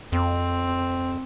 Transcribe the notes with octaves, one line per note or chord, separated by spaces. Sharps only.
F2 C4